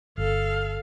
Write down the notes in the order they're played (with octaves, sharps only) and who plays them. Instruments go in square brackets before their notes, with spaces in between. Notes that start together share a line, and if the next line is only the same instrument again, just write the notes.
[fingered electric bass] G1 [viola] A4 F5